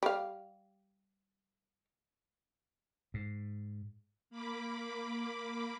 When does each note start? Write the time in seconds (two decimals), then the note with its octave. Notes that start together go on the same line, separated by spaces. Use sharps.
0.03 G3 F5
3.14 G#2
4.30 A#3 B5 D6